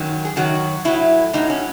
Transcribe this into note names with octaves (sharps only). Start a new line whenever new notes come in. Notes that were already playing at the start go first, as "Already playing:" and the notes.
Already playing: F#2 D#3 F#3
G#4
F#2 D#3 F#3 F#4
A2 F#3 E4
A2 F#3 D#4
C#4